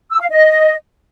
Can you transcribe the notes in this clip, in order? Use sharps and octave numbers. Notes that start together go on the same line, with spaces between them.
E6
F5
D#5